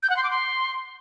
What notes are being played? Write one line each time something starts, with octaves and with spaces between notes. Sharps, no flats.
G6
F#5
C6
D6
C6